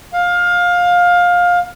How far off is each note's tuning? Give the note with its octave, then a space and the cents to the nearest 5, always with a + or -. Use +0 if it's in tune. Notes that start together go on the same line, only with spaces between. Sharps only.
F5 +20